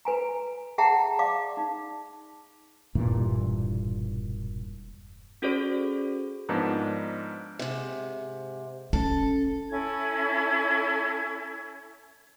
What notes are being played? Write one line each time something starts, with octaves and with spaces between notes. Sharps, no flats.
B4 G#5 A#5
G#4 E5 F#5 G5 A5 A#5
D5 F5 D6
D#4
E1 G2 A#2 E3
C#4 F#4 G#4 A4 C5 D5
G#2 F3 A#3 B3 D4 A5
G#2 C3
C#4 A4
C#4 E4 A4 G#6